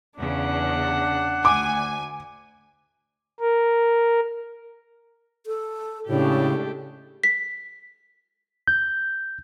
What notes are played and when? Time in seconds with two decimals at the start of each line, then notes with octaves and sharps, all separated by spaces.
0.19 E2 C#3 D4 F#5
1.45 D2 G#5 D6
3.41 A#4
5.46 A4
6.08 A2 C#3 G#3 A3 D4 G4
7.23 B6
8.67 G6